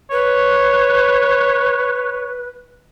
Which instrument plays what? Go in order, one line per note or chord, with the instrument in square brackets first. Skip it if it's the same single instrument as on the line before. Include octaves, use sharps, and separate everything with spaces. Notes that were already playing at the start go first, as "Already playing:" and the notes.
[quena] B4 [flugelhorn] C#5